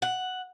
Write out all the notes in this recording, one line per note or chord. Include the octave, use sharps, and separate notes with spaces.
F#5